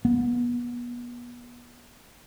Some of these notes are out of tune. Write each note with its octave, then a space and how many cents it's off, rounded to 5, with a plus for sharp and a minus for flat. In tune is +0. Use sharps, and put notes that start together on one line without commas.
B3 -30